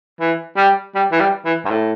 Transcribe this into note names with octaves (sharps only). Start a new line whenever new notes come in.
E3
G3
G3
E3
G3
E3
G2
A2